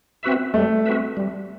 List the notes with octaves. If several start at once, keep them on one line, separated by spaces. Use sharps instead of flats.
C4 F#4 B4 E5
G3 A3
C4 F#4 B4 E5
G3